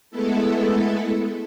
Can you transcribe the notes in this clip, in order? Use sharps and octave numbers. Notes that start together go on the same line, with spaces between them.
G#3 A3 B3 E4 A4